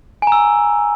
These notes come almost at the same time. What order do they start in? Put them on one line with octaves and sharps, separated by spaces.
G#5 A#5 E6